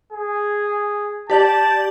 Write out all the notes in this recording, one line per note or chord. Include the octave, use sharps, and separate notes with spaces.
G#4
G4 D5 A5 G6